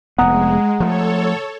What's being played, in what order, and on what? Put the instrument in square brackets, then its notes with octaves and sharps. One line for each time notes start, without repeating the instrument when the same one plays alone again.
[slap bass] F1 B3 [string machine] G#3 [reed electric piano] F#5 A#5 D#6
[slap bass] F3 A3 [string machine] A4 C#5